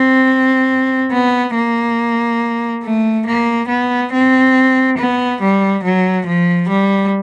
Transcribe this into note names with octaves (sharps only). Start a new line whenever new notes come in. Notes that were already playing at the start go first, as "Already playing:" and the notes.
Already playing: C4
B3
A#3
A3
A#3
B3
C4
B3
G3
F#3
F3
G3